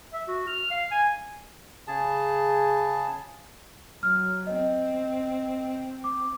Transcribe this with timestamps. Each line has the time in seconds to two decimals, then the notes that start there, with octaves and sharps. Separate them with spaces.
0.13 E5
0.28 F#4
0.47 F6
0.71 F5
0.91 G#5
1.88 C#3 G#4 A5
4.03 F#3 F6
4.47 C4 D#5
6.04 D6